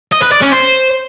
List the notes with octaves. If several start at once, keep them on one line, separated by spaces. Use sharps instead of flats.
D#5
B4
D5
C#4
C5